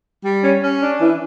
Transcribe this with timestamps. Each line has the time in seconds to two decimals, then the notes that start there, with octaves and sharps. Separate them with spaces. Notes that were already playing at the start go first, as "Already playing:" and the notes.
0.23 G3
0.42 C#4
0.62 C#4
0.81 D4
1.00 E3